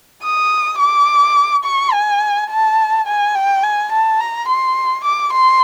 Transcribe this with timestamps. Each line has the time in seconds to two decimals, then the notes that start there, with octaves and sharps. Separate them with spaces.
0.23 D#6
0.79 D6
1.65 C#6
1.93 G#5
2.50 A5
3.06 G#5
3.35 G5
3.63 G#5
3.92 A5
4.20 A#5
4.48 C6
5.05 D6
5.33 C6